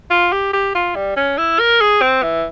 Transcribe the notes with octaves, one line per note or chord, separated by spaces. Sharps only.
F4
G4
G4
F4
G3
C#4
E4
A#4
G#4
C4
E3